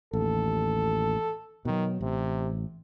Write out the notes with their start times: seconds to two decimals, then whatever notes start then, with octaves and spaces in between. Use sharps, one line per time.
0.13 A1 D#2 A4
1.65 B2 D#3 F#3
2.01 A1 C3